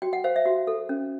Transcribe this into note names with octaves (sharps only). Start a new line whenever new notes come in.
F#4 G5
F#5
C5 F5
E5
F#4
A4
C#4